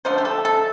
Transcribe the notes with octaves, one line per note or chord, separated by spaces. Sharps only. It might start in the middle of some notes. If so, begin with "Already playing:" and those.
D3 F3 A3 C5
G4
A4
A4